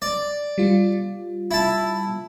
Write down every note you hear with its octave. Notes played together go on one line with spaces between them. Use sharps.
D5
G3 F4
E4 A5